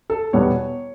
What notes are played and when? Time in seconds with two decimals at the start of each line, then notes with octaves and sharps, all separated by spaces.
0.10 A4
0.33 E2 B2 G3 B3 C#5